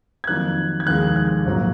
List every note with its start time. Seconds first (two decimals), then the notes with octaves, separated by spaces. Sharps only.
0.24 G#6
0.27 F2 D#3 F#3 A#3 F#6
0.80 G#6
0.86 F1 D#2 D#3 G#3 F#6
1.16 F#6
1.46 A#1 G#2 F#3 A#3